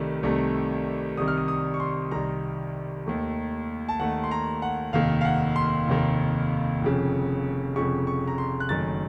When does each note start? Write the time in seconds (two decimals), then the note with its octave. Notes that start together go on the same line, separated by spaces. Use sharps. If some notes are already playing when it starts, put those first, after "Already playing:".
Already playing: C2 C3 D#3 A3
0.23 C2 C3 D#3 A3
1.17 C2 C3 D#3 D#6
1.28 F6
1.37 D#6
1.48 D#6
1.74 C#6
1.80 C6
2.11 C2 C3 D#3 A#5
3.06 D#2 D#3 A3
3.88 A5
3.99 D#2 D#3 A3 F#5
4.24 C6
4.31 A#5
4.62 F#5
4.93 F1 D#2 D#3 F5
5.21 F5
5.25 F#5
5.56 C6
5.88 F1 D#2 D#3
6.82 F1 F2 C#3
7.76 F1 F2 C#3 C#6
8.07 C#6
8.27 A#5
8.38 C6
8.60 F#6
8.69 F#1 F#2 D#3 A3 A6